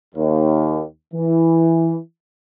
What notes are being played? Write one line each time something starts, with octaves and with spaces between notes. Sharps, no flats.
D#2
E3